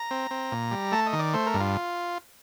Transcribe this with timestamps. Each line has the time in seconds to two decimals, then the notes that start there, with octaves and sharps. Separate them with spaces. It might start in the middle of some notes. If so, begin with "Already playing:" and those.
Already playing: A#5
0.11 C4
0.31 C4
0.52 A#2
0.71 G3
0.92 A3 A5
1.06 D#5
1.13 D#3
1.19 D5
1.34 A3 C5
1.47 A#4
1.54 G2
1.60 F4